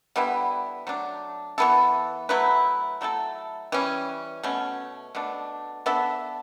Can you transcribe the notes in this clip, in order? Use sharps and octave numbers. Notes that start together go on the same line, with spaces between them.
D3 G3 B3 E4
F#3 A3 D4
E3 B3 E4 A4
F#3 A3 E4 B4
F#3 A3 E4 A4
E3 G3 C#4
B2 A3 C#4
B2 A3 D4
B3 D4 A4 E5